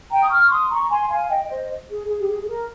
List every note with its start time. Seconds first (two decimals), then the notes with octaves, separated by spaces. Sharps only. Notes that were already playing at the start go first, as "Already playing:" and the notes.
0.11 G5 A#5
0.21 D#6
0.31 C#6 F6
0.50 C6 D#6
0.70 A#5 C#6
0.82 A#5
0.90 G#5 C6
1.10 F5 G#5
1.29 D#5 G5
1.49 C5 D#5
1.89 G#4
2.09 G#4
2.18 G4
2.28 G#4
2.44 G#4
2.48 A#4